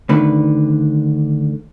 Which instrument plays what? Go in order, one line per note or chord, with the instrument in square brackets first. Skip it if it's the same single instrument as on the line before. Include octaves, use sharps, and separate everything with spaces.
[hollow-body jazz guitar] D2 D3 D#3 B4